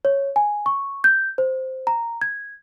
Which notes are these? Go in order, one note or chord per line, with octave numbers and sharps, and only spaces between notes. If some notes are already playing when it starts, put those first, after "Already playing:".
C#5
G#5
C#6
G6
C5
A#5
G#6